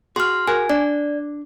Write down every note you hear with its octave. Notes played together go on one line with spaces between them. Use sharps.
F#4 G#4 C6 F6
F#4 G#4 A#4 G#5
D4 D5